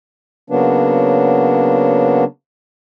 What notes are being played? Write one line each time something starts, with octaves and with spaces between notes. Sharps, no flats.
C#3 F#3 A#3 B3 D4